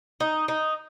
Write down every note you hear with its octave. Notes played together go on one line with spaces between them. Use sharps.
D#4
D#4